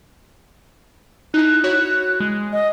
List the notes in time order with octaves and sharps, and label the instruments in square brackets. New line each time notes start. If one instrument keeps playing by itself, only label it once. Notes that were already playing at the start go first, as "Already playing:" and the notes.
[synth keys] D#4 E4 [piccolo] F#6
[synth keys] E4 F#4 C#5
G#3
[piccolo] D#5